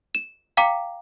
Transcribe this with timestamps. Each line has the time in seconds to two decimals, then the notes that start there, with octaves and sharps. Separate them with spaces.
0.15 E7
0.57 F5 G5 A#5 D6